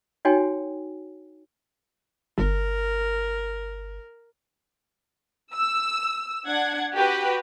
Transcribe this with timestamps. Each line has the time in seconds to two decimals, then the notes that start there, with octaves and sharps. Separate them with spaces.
0.25 D#4 F#4 C#5 G5 G#5
2.38 G1 A#4
5.54 E6
6.47 D4 F#5 G#6
6.94 F#4 G4 B4 G5